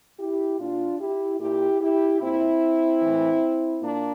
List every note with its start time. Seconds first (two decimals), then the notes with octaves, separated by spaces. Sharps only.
0.19 E4 G4
0.59 A#2 D4 F4
1.00 E4 G4
1.40 A#2 E4 G4
1.81 E4 G4
2.21 A#2 C4 E4
3.01 A2 E3
3.82 A#2 A#3 D4